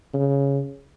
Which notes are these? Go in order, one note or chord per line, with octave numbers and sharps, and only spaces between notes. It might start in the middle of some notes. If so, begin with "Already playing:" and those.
C#3